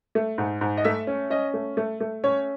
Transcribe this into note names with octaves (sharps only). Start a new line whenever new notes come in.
A3
G#2
G#2
D#5
A3 E5
C#4
C#4 D#5
A3
A3
A3
C#4 C#5